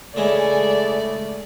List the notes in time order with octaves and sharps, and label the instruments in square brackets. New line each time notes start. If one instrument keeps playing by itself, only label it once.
[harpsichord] C#3 E3 G#3 [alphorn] A3 [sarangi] D5